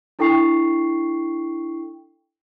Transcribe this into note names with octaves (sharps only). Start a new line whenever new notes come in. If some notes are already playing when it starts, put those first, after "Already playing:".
D4 E4 A4 G5 C#6 C7